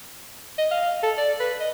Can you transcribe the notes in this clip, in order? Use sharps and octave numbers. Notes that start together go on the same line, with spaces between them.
D#5
F5
A4
D5
B4
D#5